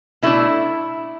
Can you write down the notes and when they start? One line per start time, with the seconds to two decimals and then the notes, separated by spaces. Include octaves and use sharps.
0.22 B2 A3 D4 E4